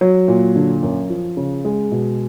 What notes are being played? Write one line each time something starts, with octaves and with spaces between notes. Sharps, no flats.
F#3
A#2
D3
F#2
F3
C#3
G#3
B2